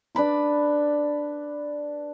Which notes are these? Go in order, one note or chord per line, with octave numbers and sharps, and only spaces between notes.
D4 B4 B5 D6